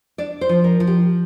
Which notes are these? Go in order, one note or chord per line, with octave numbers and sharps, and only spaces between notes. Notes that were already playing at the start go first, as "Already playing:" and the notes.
D4 D5
C5
F3
A#4
F3
G4